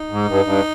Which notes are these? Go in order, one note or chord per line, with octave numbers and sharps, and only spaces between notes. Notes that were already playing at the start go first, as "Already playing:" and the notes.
Already playing: D#4
G#2
G2
G2